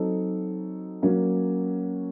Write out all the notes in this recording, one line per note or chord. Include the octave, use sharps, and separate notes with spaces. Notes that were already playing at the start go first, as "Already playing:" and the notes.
Already playing: F#3 C4 D#4 A4
F#3 A#3 C#4 F#4